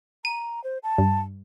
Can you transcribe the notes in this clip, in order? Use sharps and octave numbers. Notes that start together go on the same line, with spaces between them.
A#5 D#7
C5
A5
G2